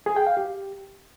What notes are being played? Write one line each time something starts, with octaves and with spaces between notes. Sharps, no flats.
G#4
G5
F5
G4